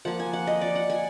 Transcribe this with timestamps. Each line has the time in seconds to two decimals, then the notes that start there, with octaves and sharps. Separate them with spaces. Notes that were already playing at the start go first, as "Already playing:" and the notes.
0.05 F3 A#3 F#5
0.20 G#5
0.33 F#5
0.47 D#5
0.61 D5
0.75 F#5
0.90 G#5